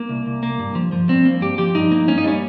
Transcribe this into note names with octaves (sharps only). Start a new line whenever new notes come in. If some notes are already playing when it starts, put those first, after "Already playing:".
Already playing: A#3
C2
C2
A#3
G2
F3
F3
G2 C4
A#3
G2 G4
F3 G4
G2 D#4
A#3
A#3 C#4
D#4
G3 C#4